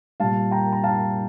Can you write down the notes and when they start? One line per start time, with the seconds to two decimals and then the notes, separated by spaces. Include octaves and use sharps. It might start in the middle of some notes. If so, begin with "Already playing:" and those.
0.20 A#2 G3 F5 A5
0.51 G5 A#5
0.73 A#5
0.84 F5 A5